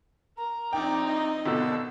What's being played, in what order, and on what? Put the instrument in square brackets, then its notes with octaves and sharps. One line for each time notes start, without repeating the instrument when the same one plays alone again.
[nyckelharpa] A#4 [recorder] A#5
[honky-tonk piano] A#1 G5 [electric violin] C4 D#4 [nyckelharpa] D5
[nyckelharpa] D#5
[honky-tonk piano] G#1 B2 D3 [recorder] E6